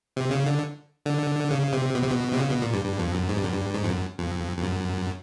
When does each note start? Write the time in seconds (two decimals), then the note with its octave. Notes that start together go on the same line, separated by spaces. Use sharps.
0.16 C3
0.31 C#3
0.46 D3
1.06 D3
1.50 C#3
1.73 C3
1.95 B2
2.03 C3
2.11 B2
2.33 C3
2.40 C#3
2.51 B2
2.62 A#2
2.73 G2
2.85 G2
2.99 F2
3.14 F#2
3.29 G#2
3.37 G2
3.45 F#2
3.53 G2
3.74 G#2
3.84 F2
3.89 F#2
4.18 F2
4.57 F2
4.63 F#2